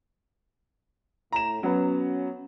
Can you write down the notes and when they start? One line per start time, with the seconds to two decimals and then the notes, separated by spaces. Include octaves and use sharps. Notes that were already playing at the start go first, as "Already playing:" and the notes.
1.32 A2 A#5 E7
1.63 F#3 B3 C#4